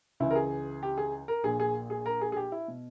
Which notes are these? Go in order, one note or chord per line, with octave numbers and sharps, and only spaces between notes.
C#2 C#3 E3 E4
A#4
G#4
G4
G#4
A#4
A#1 A#2 G#4
G#4
G#4
A#4
G#4
G#4
G4
E4
B2